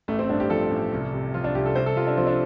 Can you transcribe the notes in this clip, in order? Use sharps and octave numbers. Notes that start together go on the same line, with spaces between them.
A1 A3
C4
G2 D4
G4
F3 A4
A1
C2
C3
F3 F4
D4
C2 G4
A4
C2 C5
A4
C3 F4
D4
F3 C4
D4